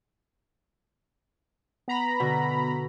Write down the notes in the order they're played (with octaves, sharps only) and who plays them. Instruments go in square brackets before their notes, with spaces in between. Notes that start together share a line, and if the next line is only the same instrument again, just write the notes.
[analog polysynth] B3 A#5 B5
[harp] B2 D3